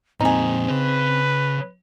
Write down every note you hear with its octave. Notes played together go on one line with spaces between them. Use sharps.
F2 A#2 C4 D#4 G#4
C#3 C#4 B4